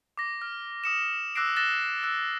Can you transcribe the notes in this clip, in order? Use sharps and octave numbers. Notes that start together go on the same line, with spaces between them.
D6 A#6
F6
D#6 C#7 E7
D6 E6 F#6 A#6 C7 D7
F#6 A6 A#6 E7 G7
E6 F#6